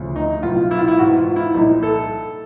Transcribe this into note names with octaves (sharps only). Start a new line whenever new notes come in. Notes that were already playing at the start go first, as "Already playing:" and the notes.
Already playing: D2 C#3 F3
D#4
C2 B2 F#3 F4
E4
F4
E4
G#2 E3 F#4
F4
E4
C2 A#2 F3 D#4
A4